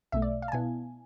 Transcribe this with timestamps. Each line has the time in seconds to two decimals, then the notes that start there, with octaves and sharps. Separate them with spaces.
0.12 B1 B2 A3 E5
0.22 D5
0.42 F5
0.48 A5
0.52 B2 B3 E4 G#5